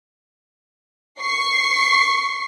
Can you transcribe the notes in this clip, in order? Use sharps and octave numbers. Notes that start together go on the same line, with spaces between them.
C#6 C7